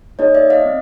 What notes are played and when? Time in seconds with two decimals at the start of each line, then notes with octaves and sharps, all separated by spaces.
0.19 A#3 D#4 G#4 C#5 D#5
0.35 D5 E5
0.50 D#5 F5
0.66 C4